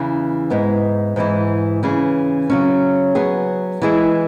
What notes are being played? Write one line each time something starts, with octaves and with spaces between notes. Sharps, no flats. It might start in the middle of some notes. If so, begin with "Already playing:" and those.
Already playing: E2 C#3 E3
G#2 G#3 B3 E4
G#2 E3 G#3 E4
C#3 E3 C#4 G#4
C#3 F#3 C#4
F#3 B3 G#4
E3 G#3 E4 G#4